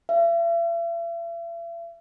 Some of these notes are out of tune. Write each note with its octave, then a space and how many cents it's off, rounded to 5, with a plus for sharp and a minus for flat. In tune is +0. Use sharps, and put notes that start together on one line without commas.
E5 +45